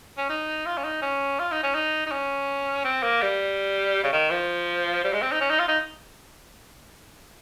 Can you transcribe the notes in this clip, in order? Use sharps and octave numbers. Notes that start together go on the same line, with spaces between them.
C#4
D#4
F4
C#4
D#4
C#4
F4
D#4
C#4
D#4
D#4
C#4
C4
A#3
G3
C#3
D#3
F3
G3
G#3
C4
D#4
C#4
D#4
F4
D#4